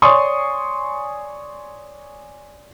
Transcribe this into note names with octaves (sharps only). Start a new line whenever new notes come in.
C#5 D5 G#5 C6 C#6 D#6